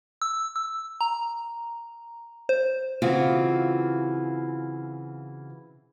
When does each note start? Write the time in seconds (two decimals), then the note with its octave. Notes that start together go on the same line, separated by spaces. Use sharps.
0.22 E6
0.56 E6
1.01 A#5
2.49 C5
3.02 C#3 E3 C4 F4 F#4